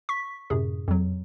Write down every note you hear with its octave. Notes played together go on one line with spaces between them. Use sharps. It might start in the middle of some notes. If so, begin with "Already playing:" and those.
C#6 B6
F#2 A2 C3 G#4
F2 F#3